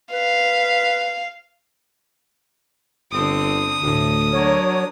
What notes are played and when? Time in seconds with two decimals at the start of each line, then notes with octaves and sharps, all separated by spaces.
0.12 B4 F5
3.12 G1 D3 C4 D#6
3.82 D2 A2
4.33 F#3 D4 A#4 C#5